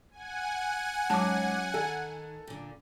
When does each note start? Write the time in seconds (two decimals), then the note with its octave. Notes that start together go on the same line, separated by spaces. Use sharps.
0.11 F#5 G#5
1.10 G#2 F#3 C#4 A5 D6
1.74 D#3 A4
2.47 A#2 D3